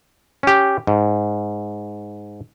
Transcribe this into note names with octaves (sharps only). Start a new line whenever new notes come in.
C#4 G4
G#2